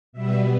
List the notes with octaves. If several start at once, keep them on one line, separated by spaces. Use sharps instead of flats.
B2 G3 B3 E5